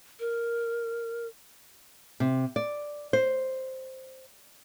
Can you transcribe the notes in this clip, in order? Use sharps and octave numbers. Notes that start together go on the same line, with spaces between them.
A#4
C3
D5
C5